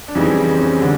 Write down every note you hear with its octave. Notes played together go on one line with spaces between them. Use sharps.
D4
F2 C#3 E3 G3 D#4
C4
C#4
D3 G3 D4